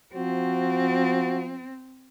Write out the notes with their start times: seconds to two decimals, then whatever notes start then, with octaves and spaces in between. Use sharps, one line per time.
0.14 F3 C4 F#4